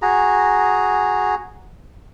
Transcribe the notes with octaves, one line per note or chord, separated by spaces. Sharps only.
F#4 G#4 A#5